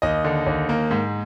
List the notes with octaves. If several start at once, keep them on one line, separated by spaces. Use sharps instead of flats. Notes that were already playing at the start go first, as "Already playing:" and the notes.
D#2 D#5
D3
D#2
A#3
G#2